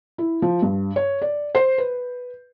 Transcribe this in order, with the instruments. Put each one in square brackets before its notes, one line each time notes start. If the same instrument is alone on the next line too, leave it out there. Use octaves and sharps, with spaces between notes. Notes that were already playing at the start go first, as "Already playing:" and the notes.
[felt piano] E4
F3
G2
C#5
D5
C5
B4